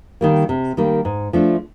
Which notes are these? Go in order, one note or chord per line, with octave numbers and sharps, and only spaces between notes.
D#3 G3 A#3
C3
D#3 G3 A#3
G#2
F3 A3 D4